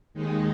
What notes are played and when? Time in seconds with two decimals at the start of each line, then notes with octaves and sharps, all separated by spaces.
0.14 D#2 D#3 G#3 D#4